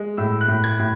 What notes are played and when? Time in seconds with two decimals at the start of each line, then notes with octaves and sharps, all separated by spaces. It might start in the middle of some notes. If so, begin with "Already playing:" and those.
Already playing: G#3
0.17 A2 E6
0.41 F#6
0.48 A2
0.64 G#6
0.79 A2